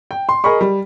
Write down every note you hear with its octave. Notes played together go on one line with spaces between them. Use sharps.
G5
C6
G#4 A#4 D#5 B5 C#6
G3